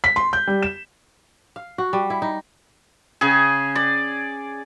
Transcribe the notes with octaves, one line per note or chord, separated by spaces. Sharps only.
B6
C6
G6
G3
E7
F5
F#4
G3
E4
D#4
C#3 G#4
D5